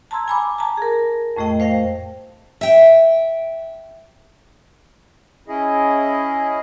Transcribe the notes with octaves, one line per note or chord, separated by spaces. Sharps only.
A5 A#5 C6 E6 G#6
G#5 B5 D6
A5 A#5
G#4 A#4
F2 A2 A3 D#5 G5
A3 C5 F5 G5 A#6
E5 G5
C#4 E4 G#4 D#5